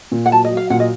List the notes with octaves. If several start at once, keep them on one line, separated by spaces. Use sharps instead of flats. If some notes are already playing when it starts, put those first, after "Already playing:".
A#2
F#5
F#3 A5
D#5
F#3
F5
A#2 F#5
D#5